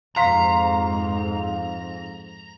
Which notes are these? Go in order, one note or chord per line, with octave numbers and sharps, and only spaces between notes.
F2 G#2 F5 A#5 C6 B6